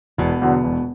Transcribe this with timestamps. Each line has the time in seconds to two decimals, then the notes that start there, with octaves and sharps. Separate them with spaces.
0.18 E1 B2
0.42 E2 D3 F#3
0.64 E1